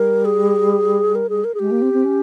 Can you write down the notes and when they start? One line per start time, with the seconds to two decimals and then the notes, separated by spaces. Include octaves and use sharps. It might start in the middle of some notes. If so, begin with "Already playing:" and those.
Already playing: G3 A#4
0.25 G#4
1.15 A#4
1.29 G#4
1.44 A#4
1.54 G#4
1.59 G#3 G4
1.70 A#3
1.81 C4
1.93 C4
2.04 C#4